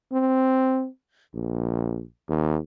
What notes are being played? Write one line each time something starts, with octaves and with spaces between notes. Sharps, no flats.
C4
A#1
D#2